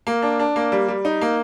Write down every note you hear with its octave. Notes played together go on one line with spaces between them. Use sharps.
A#3
D4
D4
A#3
G3
G3
D#4
A#3